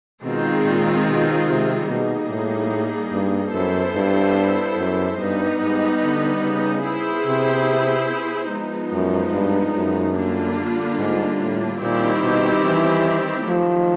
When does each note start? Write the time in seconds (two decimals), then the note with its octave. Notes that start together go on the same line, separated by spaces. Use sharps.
0.23 B2 D#3 G#3 C4 F4 G#4
0.65 A#2
1.06 B2
1.48 C3
1.89 B2 G3 A#3 D#4 G#4
2.31 A2
3.13 G2
3.54 F#2 B3 E4 A4 C5
3.96 G2
4.79 F#2
5.19 G2 G3 B3 D#4
5.61 G#2
6.03 D3
6.44 C#3
6.85 B3 E4 G#4 C5
7.26 C3
8.51 F3 G#3 B3 D#4
8.93 F#2
9.33 G2
9.76 F#2
10.17 D3 G3 A#3 D4 F4
10.99 G#2
11.40 A2
11.82 A#2 D#3 G3 C4 E4 G4
12.23 B2
12.65 E3
13.47 D#3 F3 F#3 A3